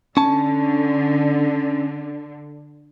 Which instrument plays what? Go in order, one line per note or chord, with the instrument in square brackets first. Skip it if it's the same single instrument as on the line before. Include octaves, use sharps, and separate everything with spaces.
[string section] D3 [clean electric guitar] C#4 A5